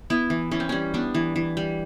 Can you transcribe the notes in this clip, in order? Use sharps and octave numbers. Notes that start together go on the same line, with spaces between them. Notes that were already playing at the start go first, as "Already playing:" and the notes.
B3 E4
E3
E3 C#4
C4
G3 C#4
B3 D4
E3
E3
G3